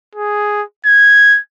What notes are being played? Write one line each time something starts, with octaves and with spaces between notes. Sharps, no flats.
G#4
G#6